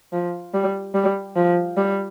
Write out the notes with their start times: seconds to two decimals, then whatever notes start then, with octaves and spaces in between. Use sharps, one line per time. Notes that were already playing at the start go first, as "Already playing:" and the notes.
0.13 F3
0.54 G3
0.94 G3
1.36 F3
1.77 G3